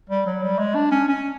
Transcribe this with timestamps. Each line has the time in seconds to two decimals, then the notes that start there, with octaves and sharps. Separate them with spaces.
0.10 G3
0.26 F#3
0.42 G3
0.59 G#3
0.75 D4
0.91 C#4
1.08 C#4